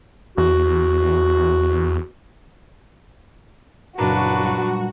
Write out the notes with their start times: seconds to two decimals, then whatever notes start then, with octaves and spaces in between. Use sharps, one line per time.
0.38 E2 F#4
3.98 F#1 A#2 D4 F#4 B4 A#5
4.43 G3